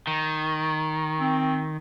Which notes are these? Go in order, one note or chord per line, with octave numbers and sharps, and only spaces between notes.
D#3
C4